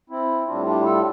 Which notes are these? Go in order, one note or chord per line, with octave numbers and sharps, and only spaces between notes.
C4 E4
A2 G3 D4 F4
D4 F4
F4 A4